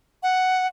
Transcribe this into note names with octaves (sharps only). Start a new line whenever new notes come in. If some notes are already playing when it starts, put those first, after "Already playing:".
F#5